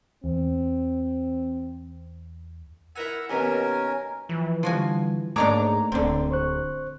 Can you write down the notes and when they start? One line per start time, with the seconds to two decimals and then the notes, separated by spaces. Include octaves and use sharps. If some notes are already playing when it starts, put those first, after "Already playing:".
0.24 E2 C4
2.96 E4 A#4 F#5 G#5 E6
3.30 D#2 B2 C#4 A#4 G#5 A#5
4.29 E3 F3
4.63 D3 F3 G3 F#4 G#5
5.36 G#2 A3 A#3 D4 D#4 C#5 A#5 D6
5.92 D1 D3 C4
6.31 C5 C#6 F#6